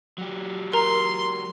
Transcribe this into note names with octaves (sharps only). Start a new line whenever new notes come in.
F#3 G4
A#4 A#5 C6